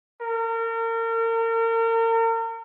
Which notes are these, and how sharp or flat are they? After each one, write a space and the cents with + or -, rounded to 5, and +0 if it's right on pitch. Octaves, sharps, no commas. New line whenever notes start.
A#4 -35